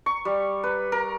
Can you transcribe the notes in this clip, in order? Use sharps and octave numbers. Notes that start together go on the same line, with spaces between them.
C#6
G3
B4
A#4